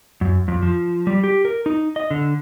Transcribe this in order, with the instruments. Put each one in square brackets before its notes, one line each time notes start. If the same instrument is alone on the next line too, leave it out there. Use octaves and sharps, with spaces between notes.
[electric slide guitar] F#2
F2
F3
G3
G4
A#4
D#4
D#5
D3